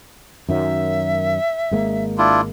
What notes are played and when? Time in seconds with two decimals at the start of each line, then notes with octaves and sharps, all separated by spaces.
0.49 F#2 D#3 F#3 E5
1.71 G#1 G#3 A#3
2.18 D4 E4 F4